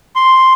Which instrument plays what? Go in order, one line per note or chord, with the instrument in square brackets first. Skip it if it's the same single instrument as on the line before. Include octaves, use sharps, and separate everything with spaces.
[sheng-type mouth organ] C6